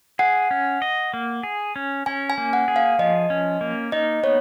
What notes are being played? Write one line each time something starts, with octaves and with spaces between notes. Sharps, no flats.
G#4 F#5
C#4
D#5
A#3
G#4
C#4
C#4 G#5
G#5
A#3
F#5
G#4
F5
F3 D#5
C#4
A#3
D#4 D#5
B3 C#5